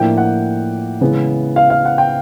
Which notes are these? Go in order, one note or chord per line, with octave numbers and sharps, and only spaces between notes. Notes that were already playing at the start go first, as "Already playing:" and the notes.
Already playing: A2 F3 A#3 D4 G5
F#5
C#3 E3 G#3 B3
F5
F5
F#5
G5